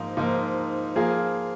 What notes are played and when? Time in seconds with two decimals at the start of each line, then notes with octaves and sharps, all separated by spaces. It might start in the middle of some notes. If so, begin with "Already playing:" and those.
Already playing: G#2 F3 A#3 D#4
0.17 G#2 F3 A#3 D#4
0.96 F3 A#3 F4 G#4